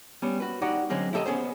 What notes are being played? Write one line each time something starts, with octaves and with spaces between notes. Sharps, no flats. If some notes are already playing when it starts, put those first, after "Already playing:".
G3 B3 C#4
F#4 B4
D#4 F#4 G4 D5 F#5
D3 F#3 G#3 C4 C#4
E4 G4 A4 C5 D#5 A#5
B3 C#4 G#4 C5